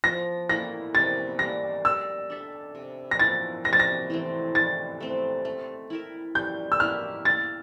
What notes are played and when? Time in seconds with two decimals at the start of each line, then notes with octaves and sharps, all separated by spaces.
0.04 F3 A#6
0.49 A#3 E4 A4 A#6
0.94 C3 A6
1.39 G3 A#3 A#6
1.85 G3 E6
2.30 D4 A4 E5
2.75 C3
3.11 A#6
3.19 F3 A#3 E4 A6
3.65 C3 A#6
3.73 A6
3.80 A#6
4.10 E3 A3 C4
4.55 E3 A6
5.00 A3 C4
5.45 A3
5.90 E4 A#4 E5
6.35 G3 G6
6.72 E6
6.80 A#3 E4 G4 F6
7.25 A#3 A6